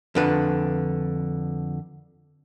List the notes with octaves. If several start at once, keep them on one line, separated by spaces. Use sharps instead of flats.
F2 D3 B4